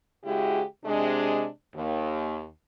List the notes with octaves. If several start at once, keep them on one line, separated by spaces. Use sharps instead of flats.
C#3 G#3 E4 F#4 G4
C3 G#3 D4
D#2